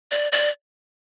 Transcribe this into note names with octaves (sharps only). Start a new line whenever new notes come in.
D5
D5